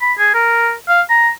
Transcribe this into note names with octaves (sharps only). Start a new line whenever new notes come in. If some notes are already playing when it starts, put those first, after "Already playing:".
B5
G#4
A#4
F5
A#5